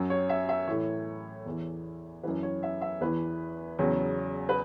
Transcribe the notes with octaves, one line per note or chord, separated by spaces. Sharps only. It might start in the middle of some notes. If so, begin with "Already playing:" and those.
Already playing: F#2 F#3
C#5
E5
E5
A2 E3 C#5
E2 E3
F#2 E3 B4
C#5
E5
E5
E2 E3 B4
E2 C#3 F#3
B4